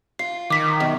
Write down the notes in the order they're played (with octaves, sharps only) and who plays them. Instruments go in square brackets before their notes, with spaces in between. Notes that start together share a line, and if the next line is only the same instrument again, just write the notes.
[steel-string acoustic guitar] F4 [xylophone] C7
[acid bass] D#3 [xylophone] D6 B6
[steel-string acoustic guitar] F#2 B2